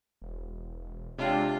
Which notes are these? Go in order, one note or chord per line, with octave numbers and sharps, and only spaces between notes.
E1
C3 G#3 D4 F4 C#5 G5